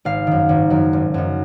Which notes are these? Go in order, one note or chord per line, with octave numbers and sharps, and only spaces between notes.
G#1 F5
F#2 D#3
G#1
F#2 D#3
G#1
F#2 D#3